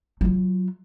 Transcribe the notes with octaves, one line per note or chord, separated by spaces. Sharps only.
F#3 F4